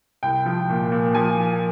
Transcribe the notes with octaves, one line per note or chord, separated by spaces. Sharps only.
C2 G5
F3
A#2
A#2
F3 G#5